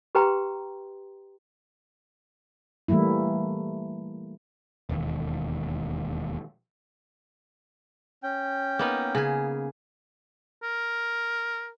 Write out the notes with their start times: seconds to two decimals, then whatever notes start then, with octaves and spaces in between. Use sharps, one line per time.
0.15 G4 B4 G5 A#5 C6
2.88 E3 G3 A3 A#3 E4
4.89 E1 D#2
8.23 C#4 G5
8.79 A#3 B3 D#4
9.15 C#3 G#4
10.63 A#4